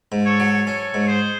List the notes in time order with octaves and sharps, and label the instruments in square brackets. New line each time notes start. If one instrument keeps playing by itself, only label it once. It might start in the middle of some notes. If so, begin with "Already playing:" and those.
[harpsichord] G#2
[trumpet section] A4 C#5
[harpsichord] F#3
[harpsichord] C#4 [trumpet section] A4 C#5
[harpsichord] G#2
[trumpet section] G#4 C5